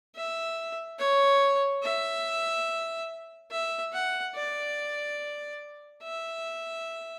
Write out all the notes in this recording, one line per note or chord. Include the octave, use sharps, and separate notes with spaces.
E5
C#5
E5
E5
F#5
D5
E5